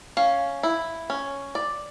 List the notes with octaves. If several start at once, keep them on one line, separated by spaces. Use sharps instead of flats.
C#4 F5
E4
C#4
D5